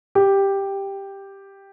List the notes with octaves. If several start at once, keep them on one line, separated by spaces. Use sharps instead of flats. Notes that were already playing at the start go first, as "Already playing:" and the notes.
G4